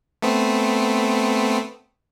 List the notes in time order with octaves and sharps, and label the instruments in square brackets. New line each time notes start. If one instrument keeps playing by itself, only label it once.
[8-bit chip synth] A3 B3 C4